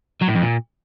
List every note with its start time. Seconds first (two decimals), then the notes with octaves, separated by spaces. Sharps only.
0.22 F#3
0.29 A2
0.35 F2
0.42 A#2